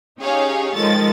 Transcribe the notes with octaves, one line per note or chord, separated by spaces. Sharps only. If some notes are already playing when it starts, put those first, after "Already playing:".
C#4 D#4 G4 G#4 C#5 F5
D#3 F3 G#3 A4 A6